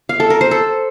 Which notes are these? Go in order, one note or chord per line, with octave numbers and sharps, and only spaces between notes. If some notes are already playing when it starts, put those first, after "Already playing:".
F5
A4
A#4
C5
A4